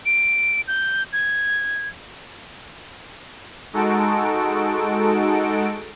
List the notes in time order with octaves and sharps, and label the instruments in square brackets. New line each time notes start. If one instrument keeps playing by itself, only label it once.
[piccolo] D7
G6
G#6
[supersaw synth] G#3 D#4 F#4 A4 D7